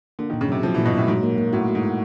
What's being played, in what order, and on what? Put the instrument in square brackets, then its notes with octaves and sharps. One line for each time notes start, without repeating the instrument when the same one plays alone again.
[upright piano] D3 [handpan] A#3
[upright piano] D#3
[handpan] A#2
[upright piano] C#3
[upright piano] C3 [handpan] F#3
[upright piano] F3 [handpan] F#3
[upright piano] E3
[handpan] A#2
[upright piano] B2
[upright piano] A2 [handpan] F#3
[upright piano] G#2 [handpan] F#3
[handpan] A#3
A#3
[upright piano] A2 [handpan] F#4
[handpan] F#4
[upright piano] G#2
[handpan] F#4